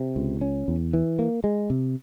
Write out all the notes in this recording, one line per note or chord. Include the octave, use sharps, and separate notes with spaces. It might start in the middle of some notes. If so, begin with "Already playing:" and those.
Already playing: C3
C#2
C#4
E2
E3
A#3
G#3
C3